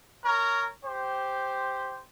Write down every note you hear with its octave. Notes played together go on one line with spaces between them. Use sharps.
A#4 C#5 A#5
G4 C5